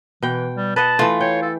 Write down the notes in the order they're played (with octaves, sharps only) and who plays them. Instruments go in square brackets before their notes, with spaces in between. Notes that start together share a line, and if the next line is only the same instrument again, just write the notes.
[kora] B2 G5 [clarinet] E3
[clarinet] G3
[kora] B4 D#5 F#5 [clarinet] A5
[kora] E3 A3 [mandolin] F4
[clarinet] C#5 [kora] G5
[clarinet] A4